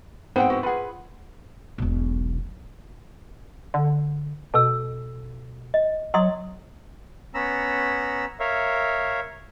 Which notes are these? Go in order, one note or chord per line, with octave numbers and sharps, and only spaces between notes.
G#2 B3 C4 B4 F#5 G5
E4 F#4
F4 G#4 B4 F#5
E1 B1
D3
B2 A4 E6
D#5
F#3 D#5 C6 D#6
B3 C#4 A#5 B5 E6
A#4 C#5 E5 F5